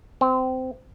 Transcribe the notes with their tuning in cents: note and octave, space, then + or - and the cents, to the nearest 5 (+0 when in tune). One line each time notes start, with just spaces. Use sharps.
C4 -20